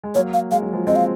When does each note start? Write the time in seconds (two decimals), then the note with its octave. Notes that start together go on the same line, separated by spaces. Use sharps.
0.04 G#3
0.15 F#3 A#3 C#5
0.34 F5
0.51 G#3 F5
0.63 F#3
0.73 F3 G#3
0.87 G#3 C4 D#5
0.96 F5